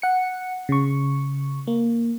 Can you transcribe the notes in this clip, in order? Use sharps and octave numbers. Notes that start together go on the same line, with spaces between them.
F#5 C#7
C#3 C#6
A#3